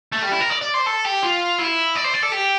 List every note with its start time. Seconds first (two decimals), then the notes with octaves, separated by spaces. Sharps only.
0.12 A3
0.22 G3
0.32 E4
0.40 A#4
0.50 D5
0.61 D5
0.74 C5
0.86 A4
1.05 G4
1.23 F4
1.59 E4
1.96 D5
2.04 C5
2.14 D5
2.23 A4
2.32 G4